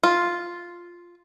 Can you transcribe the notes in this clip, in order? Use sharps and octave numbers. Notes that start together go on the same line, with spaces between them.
F4